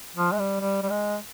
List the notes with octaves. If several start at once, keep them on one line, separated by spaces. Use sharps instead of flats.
F3
G#3
G3
G3
G3
G#3